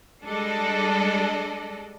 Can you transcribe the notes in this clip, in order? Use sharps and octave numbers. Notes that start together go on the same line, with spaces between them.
G3 G#3 D4 A4 D5 D#5